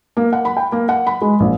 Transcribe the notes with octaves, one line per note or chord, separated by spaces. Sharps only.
A#3
F#5
B5
G5
A#3
F#5
B5
G#3
A#1